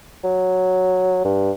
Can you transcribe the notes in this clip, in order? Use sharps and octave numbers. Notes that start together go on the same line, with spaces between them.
F#3
G2